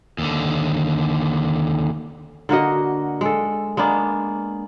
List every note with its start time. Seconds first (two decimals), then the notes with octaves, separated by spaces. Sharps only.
0.18 D#2 D3
2.49 D3 A#3 F#4 D#5
3.21 G#3 A4
3.77 G#3 A#3 B3 D4